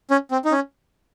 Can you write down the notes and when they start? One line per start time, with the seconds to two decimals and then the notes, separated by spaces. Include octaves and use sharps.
0.11 C#4
0.31 C4
0.45 D#4
0.52 C#4